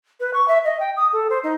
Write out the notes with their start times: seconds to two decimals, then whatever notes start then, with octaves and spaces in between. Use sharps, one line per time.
0.20 B4
0.33 C#6
0.48 E5
0.64 D#5
0.80 G5
0.96 D#6
1.12 A4
1.30 C5
1.43 D#4